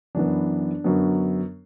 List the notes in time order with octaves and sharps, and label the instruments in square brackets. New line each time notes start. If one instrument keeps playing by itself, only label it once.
[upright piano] F#2 E3 B3 D4
F#2 D3 F#3 B3